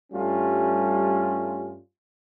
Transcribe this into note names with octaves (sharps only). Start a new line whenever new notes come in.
G2 G3 A3 C#4 F4